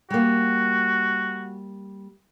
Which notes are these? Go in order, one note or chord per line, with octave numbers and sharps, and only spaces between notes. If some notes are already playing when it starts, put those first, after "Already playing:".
G3 A#3 F#4